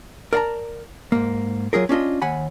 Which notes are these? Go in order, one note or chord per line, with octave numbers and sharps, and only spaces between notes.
A#4 D5 F5 A5 A#5
G#2 A#3
F#3 F4 G#4 A#4
C#4 D4 F4 D#5
D#2 F#5 G#5 B5